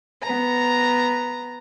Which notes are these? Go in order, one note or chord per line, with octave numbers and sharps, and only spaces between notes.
B3 A#5